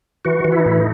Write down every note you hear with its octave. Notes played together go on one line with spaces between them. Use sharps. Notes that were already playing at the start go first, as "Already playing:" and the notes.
E3 F#4
E3
E4
D#4
A2 E4
D#4